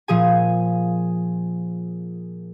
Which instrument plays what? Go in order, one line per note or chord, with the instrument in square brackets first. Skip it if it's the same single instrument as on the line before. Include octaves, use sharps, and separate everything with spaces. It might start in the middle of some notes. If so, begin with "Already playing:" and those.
[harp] A#2 F3 G#4 G#5